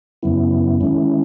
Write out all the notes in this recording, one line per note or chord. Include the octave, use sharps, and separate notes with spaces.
F#2 C#3 F#3 B3 E4
D#3 G#3 C#4 E4